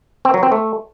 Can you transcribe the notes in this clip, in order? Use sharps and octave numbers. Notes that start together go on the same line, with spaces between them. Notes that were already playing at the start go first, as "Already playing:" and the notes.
C4
F#3
C4
A3